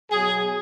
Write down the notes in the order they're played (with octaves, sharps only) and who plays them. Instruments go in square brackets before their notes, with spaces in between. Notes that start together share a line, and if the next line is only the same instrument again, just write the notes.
[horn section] B2 F#3 G#4